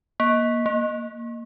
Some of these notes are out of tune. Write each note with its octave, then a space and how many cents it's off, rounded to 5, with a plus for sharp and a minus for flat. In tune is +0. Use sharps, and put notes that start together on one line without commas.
A#3 +25
A#3 -5